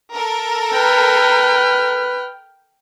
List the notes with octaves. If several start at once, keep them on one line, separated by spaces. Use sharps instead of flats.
A4 A#4
B4 G5 F6